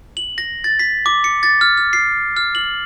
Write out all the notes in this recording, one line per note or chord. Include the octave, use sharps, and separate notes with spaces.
F#7
A#6
A6
B6
D6
C#7
A6
F6
F6
C7
F6
F#7